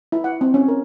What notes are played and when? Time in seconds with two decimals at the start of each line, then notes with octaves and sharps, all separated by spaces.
0.12 E4
0.24 F#5
0.41 C4
0.54 C#4
0.68 A#4